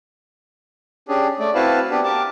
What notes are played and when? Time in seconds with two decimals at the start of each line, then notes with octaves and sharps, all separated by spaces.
1.09 C#4 D4 G4 G#4
1.39 A3 D5
1.55 C4 E4 F#4 B4 F5 A5
1.91 B3 D4 G4 B4
2.04 G4 A#4 A5 D6